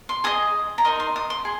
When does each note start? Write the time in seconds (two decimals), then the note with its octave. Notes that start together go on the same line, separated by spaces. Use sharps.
0.09 C6
0.24 G#4 D#5 D#6
0.78 A#5
0.85 D#4 A#4 D#5 C6
1.00 C6
1.16 D#6
1.30 C6
1.45 G#4